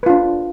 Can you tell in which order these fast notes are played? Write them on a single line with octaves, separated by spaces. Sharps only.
B4 F4 D4